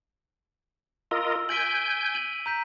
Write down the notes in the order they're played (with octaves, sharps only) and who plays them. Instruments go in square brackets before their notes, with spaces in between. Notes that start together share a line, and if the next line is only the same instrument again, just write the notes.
[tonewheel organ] F4 A#4 D#5 [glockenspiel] E6
[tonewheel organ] G#5 G6 [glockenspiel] B6 D7 F#7
[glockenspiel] D#7 F#7
A#5 G6 B6